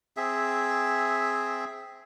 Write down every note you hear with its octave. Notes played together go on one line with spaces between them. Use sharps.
C4 G#4 E5